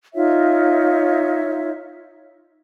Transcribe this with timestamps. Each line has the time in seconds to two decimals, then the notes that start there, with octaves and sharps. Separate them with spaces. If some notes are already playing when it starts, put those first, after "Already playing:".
0.15 D#4 F4 C#5 E5